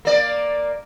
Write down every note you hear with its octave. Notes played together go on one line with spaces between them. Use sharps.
A#3 D5